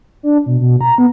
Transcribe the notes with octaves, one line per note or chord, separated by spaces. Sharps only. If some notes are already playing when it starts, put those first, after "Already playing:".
D4
B2
B2
A#5
B3